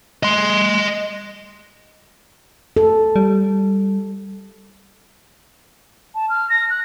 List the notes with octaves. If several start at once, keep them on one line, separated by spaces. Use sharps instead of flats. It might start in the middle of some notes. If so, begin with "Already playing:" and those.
D#5 C6
A4
G3
A5
F6
A#6
F#6